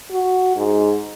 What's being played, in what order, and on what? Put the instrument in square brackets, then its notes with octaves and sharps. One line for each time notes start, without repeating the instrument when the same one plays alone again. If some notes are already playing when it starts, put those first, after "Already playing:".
[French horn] F#4
G#2